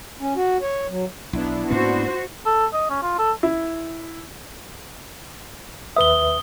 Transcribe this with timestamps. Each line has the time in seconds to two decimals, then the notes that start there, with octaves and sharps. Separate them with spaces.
0.21 C#4
0.36 F#4
0.62 C#5
0.89 F#3
1.33 B1 B3 D4 E4
1.71 G#2 A#3 C#4 F#4 C5
2.46 A4
2.73 D#5
2.90 C#4
3.02 F4
3.19 A4
3.43 E4
5.96 D#2 B4 E5 D#6 G7